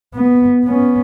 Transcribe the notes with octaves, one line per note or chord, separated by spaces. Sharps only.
B3
B3 C#4